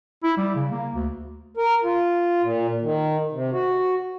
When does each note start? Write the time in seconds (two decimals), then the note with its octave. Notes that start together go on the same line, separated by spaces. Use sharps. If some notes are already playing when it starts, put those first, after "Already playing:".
0.23 E4
0.37 G3
0.55 C#3
0.72 A#3
0.94 D2
1.57 A#4
1.83 F4
2.42 A#2
2.82 D#3
3.32 C3
3.52 F#4